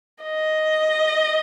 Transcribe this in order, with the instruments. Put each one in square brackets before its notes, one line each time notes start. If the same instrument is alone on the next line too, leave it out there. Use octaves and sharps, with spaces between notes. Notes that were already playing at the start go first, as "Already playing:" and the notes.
[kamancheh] D#5